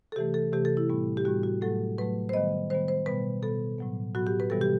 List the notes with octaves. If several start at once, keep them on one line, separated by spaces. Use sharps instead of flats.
A4
C3 E3 A3 G4
A4
C3 E3 A3 G4
A4
E4
A2 G3 B3
G4
A2 G3 B3 F#4
F#4
A2 F#3 A3 A4
A2 F#3 A3 B4
C5
D#3 G3 B3 D#5
D#3 G3 B3 C5
C5
B2 G3 B3 B4
B2 G3 B3 A4
A2 F#3 B3
A2 F#3 B3 F#4
G4
B4
C3 E3 G3 B3 A4
G4